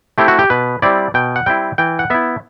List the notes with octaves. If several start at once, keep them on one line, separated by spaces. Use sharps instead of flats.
A3 C4 E4 G4
F#4
G4
B2 B4
G3 C4 E4 D5
B2 G5
F#5
G3 C4 E4 G5
E3 G5
F#5
B3 E4 E5